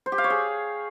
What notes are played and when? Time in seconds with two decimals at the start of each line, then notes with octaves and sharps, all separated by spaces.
0.06 C5
0.12 G4
0.18 F5
0.24 C#5
0.30 G#4